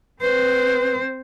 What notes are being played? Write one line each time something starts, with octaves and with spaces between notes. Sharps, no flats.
C4 B4 C5